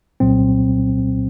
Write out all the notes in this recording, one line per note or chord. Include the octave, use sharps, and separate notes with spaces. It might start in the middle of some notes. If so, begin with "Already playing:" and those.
C2 A#2 F#3 C4